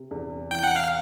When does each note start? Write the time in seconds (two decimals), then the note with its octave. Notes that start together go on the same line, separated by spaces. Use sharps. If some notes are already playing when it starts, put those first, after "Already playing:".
Already playing: C3
0.11 E2
0.51 E3 G5
0.64 F#5
0.76 F5